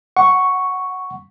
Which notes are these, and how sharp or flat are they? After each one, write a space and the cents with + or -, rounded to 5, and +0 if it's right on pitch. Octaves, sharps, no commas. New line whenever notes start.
F#5 +0 C#6 +0